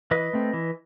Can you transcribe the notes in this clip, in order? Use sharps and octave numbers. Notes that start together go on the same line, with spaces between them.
E3 B4 D#5
A3 C4
E3